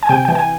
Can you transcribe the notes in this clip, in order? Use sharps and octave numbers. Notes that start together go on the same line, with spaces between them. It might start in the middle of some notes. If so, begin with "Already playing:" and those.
G#5
C3 G5
E3 G5
G#5